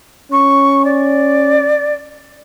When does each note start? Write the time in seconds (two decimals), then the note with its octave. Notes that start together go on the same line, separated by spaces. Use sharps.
0.31 C#4 C#6
0.84 D5